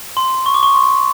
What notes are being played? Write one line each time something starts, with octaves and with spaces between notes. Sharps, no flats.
C6
C#6
D6
C#6
C6